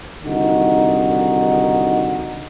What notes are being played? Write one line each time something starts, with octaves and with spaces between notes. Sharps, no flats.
C2 D3 D#3 D#4 F#4